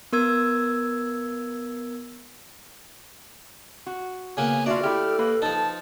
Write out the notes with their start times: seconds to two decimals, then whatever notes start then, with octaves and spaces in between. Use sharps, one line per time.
0.13 B3 A#4 E6 G#6
3.87 F#4
4.37 C#3 A#3 B3 G#5
4.66 D4 F4 F#4 D5 E5 F5
4.83 A3 E4 G4 A4 F6
5.19 A#3 B4
5.42 F3 D#4 A5